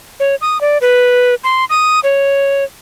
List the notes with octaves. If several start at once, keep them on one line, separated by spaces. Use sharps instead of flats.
C#5
D#6
D5
B4
C6
D#6
C#5